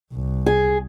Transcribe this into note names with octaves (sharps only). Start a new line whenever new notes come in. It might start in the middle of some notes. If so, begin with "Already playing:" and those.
C2
G#4